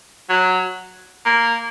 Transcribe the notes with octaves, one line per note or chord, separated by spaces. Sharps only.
F#3
A#3